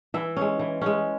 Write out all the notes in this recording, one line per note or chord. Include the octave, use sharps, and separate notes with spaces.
E3 E5
G#3 C#4
E3
G#3 C#4